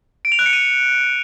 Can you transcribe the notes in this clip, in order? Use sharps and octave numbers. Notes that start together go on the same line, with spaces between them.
D7
F7
F#6
C#7
D#7